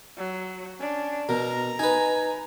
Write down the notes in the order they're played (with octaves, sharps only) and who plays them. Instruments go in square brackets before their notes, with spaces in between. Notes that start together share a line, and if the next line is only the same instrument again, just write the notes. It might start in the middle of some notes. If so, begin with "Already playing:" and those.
[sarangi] F#3
[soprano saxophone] C#4 [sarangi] D4
[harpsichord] B2 [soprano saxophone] A#4 [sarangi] A#5
[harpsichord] D#4 B4 [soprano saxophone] G#5